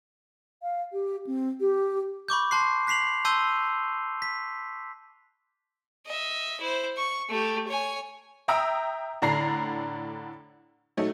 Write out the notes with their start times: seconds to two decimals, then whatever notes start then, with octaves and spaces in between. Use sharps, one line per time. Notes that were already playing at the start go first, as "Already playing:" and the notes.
0.63 F5
0.93 G4
1.27 C4
1.60 G4
2.28 B5 C#6 D6 G6
2.51 A5 C6 F#6 C7
2.87 F#6 B6 C7 F7 F#7
3.25 A5 C6 E6 G6 D#7 G7
4.22 B6
6.06 D#5 E5
6.60 E4 C5
6.98 C#6
7.29 A3 G4
7.68 C#5 G#5
8.48 E5 G5 A#5 D#6 E6 D7
9.22 A2 D3 D4 A#5 C7
10.97 F#3 A3 D#4